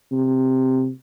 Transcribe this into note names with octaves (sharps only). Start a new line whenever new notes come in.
C3